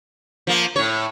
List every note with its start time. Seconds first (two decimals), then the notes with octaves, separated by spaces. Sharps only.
0.47 F3 A#3
0.76 A2 C#5